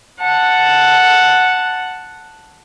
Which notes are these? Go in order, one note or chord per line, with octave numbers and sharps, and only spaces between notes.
F#5 A5